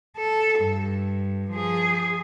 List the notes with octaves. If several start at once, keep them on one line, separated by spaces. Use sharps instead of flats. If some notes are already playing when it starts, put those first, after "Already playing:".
A4
G2
F3 G#4